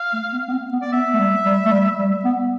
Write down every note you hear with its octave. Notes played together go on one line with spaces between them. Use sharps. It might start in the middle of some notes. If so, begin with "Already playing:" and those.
Already playing: F5
A3
B3
B3
C4
B3
D5
B3 E5
A3
G3
G3
A3
G3
G3
B3